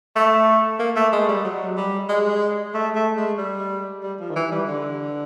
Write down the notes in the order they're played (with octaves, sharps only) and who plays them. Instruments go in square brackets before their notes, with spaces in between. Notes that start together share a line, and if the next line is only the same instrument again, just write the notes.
[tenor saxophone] A3
A#3
A3
G#3
G3
F#3
G3
G#3
A3
A3
G#3
G3
G3
F3
D#3
E3
G3
D3